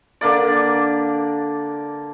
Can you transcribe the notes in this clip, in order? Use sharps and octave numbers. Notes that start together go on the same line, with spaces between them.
D3 A#3 D5